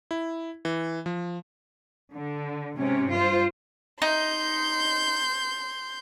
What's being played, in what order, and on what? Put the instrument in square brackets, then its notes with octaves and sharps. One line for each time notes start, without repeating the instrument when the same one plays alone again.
[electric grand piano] E4
E3
F3
[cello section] D3
G#2 C3 C#4
G2 F4 C5
[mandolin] D#4 [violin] C6 G6